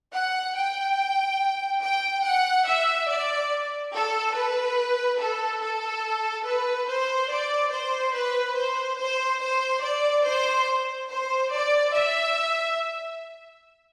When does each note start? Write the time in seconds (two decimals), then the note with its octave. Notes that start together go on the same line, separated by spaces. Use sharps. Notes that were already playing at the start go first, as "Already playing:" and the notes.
0.13 F#5
0.55 G5
1.81 G5
2.24 F#5
2.66 E5
3.08 D5
3.93 A4
4.35 B4
5.19 A4
5.61 A4
6.45 B4
6.88 C5
7.30 D5
7.72 C5
8.14 B4
8.56 C5
8.99 C5
9.41 C5
9.83 D5
10.25 C5
11.09 C5
11.52 D5
11.94 E5